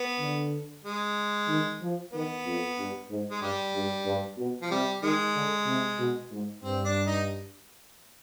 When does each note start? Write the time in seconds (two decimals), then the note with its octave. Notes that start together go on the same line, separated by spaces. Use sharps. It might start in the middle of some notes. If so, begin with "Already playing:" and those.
Already playing: B3
0.19 D3
0.84 G#3
1.48 D#3
1.81 F3
2.13 D#3 B3
2.46 F2
2.77 G2
3.10 G#2
3.30 G#3
3.41 G2 G3
3.74 G2
4.06 G2
4.38 B2
4.62 F3
4.70 C3 G3
5.02 D#3 G#3
5.35 D3
5.67 C3
5.99 B2
6.31 G#2
6.63 G2 C4
6.85 D4
7.07 D#4